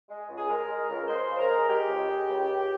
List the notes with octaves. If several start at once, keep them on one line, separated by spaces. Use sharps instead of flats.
G#3
C#2
G#4
G#3 A#4
G#3
C#2
G#3 C5
C#3
A#4
G#3
G#3 G4
C#2
G#3
C#2
C#2